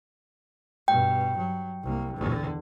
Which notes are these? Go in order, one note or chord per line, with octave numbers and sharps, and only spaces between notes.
G2 B2 G5
F#3
C2 A#3
E2 D3